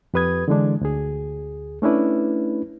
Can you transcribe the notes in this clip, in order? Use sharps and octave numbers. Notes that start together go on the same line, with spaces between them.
F2 G4 B4 D#6 G#6
D3 E3 G#3 D4
D2 G#4
A3 C#4 D4 E4 B4